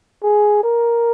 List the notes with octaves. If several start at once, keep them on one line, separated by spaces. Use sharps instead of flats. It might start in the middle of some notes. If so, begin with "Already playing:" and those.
G#4
A#4